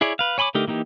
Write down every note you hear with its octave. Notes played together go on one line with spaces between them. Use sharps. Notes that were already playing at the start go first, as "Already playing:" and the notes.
E4 G#4 C#5 D5
B4 F5
C#5 G#5 B5 C6 D6
D3 A3 D#4 G4 A#4
E3 A#3 D#4 G4